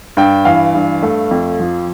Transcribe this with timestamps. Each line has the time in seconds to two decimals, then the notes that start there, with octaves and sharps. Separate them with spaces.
0.17 G2 G5
0.45 E3 F5
0.75 G2
1.03 A3
1.31 F2
1.60 F3